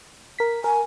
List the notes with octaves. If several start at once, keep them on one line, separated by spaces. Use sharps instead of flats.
A#4 B6
A#4 G#5